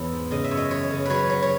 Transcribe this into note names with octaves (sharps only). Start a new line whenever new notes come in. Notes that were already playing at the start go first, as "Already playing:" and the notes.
Already playing: E2 E3 C#5
G#2
C#3 D#5
E5
F#2 C#5
D#5
E3 C#5
C#3
F#3 B4 C#5
F#3
C#5